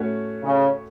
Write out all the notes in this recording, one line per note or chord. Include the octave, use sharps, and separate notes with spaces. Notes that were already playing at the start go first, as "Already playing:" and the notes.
Already playing: A2 A3 C#4 F#4 C#5
C#3